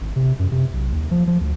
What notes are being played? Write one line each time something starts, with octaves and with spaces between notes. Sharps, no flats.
G#1
C3
F#2
C3
B1
D#2
F3
F3
D2